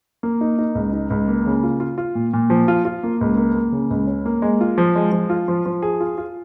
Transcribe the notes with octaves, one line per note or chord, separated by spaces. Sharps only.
A#3
D#4
D#4
C#2
D#4
C#2
A#3
C#3
F4
F4
F4
A#2
A#2
F3
F4
F4
A#3
C#2
A#3
A#3
C#3
C#2
C#4
A#3
G#3
F4
F3
G#3
F3
F4
F3
F3
G#4
F4
F4